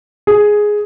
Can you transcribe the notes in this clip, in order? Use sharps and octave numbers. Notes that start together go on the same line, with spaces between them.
G#4